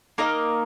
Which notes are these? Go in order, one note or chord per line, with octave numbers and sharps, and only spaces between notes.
A#3 D#4 A#4 D#5